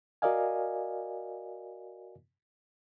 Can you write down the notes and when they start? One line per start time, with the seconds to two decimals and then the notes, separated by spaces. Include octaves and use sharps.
0.22 F#4 A#4 D5 D#5 F5 G#5